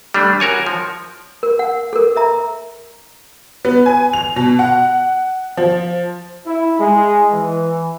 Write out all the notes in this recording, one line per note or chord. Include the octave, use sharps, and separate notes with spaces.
G3 A3 D4
F#4 A#4 C#5 G#5
F3
A#4
F#5
A4 A#4
A#4 E5 A#5
B3
G#5
F7
B2
F#5
F3
E4
G#3
E3